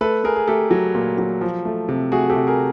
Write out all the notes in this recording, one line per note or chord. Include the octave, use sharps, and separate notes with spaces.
A3 A4 B4
A3 G#4 A#4
G#4
A3 G4 A4
F#3
A#2
F#3
F3
A3
C3
A3 F#4 G#4
G4 A4
C3
G#4 A#4